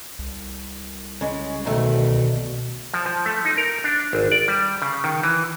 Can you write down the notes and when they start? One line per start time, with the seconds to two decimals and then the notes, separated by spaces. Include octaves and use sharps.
0.19 C2
1.21 C#3 G#3
1.65 D2 B2 D#3 A3
2.94 F3
3.06 F3
3.26 A3
3.45 D#4
3.57 A#4
3.84 D4
4.13 G#1
4.32 D5
4.48 G3
4.82 C#3
5.04 D#3
5.23 E3